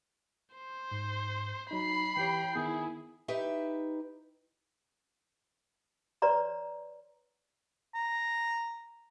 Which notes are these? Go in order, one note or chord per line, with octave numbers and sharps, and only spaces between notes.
C5
G#2
F#3 D#4 B5 C7
E3 G4 C#5 G5
D#3 B3 E4 G#4
D#4 G4 B4 E5
B4 C#5 D5 A#5 C6
A#5